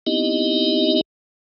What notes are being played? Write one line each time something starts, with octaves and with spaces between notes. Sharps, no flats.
B3 C4 D#4 E4 G4 D#5